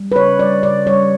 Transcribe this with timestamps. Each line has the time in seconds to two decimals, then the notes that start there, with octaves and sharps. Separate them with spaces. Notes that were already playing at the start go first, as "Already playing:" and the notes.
Already playing: G3
0.12 B4
0.16 C#3 C#5
0.39 G3 D5
0.63 C#3 D5
0.87 G3 C#5